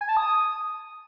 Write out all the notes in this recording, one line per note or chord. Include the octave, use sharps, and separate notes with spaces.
G#5
A5
D#6